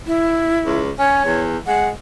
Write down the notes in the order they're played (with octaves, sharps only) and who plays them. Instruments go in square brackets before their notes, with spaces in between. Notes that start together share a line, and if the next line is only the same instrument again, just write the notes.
[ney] E4
[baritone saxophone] C#2
[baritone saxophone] C#4 [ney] C#5
[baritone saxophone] E2
[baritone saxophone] G#3 [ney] F#5